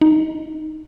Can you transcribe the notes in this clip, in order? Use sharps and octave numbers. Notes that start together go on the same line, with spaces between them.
D#4